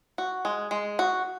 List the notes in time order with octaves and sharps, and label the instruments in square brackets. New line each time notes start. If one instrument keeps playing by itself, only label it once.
[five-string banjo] F#4
G#3
G#3
F#4